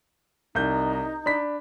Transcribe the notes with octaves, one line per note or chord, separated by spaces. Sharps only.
C2 D#4 G6
D4 B5 B6